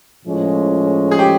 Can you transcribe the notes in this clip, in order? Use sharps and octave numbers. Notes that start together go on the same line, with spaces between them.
A2 F3 G#3 C#4
G#4
G4